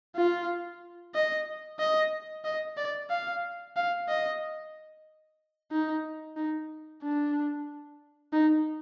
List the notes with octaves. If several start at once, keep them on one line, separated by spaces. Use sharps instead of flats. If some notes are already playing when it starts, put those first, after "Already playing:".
F4
D#5
D#5
D#5
D5
F5
F5
D#5
D#4
D#4
D4
D#4